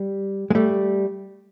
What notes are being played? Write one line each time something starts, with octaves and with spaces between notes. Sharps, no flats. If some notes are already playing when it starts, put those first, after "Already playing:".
Already playing: G3
G#3
G3 A3